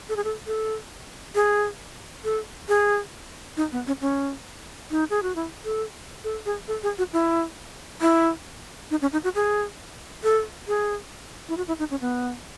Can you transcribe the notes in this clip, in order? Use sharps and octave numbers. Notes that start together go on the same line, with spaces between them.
A4
G#4
A4
A4
G#4
A4
G#4
D#4
B3
C#4
C#4
D#4
G#4
F#4
E4
A4
A4
G#4
A4
G#4
F#4
E4
E4
D#4
C#4
D#4
F#4
G#4
A4
G#4
E4
F#4
E4
D#4
C#4
B3